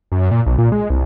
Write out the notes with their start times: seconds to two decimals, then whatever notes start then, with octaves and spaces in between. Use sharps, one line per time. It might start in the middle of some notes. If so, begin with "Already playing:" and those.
0.12 F#2
0.31 A#2
0.46 B1
0.58 A#2
0.72 G#3
0.90 C2